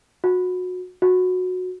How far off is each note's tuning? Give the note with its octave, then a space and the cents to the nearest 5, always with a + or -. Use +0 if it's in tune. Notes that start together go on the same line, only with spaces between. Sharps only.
F#4 -25
F#4 -15